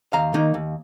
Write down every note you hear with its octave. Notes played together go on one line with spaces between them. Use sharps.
D#2 F5 A#5
D#3 A#3 D#4
D#2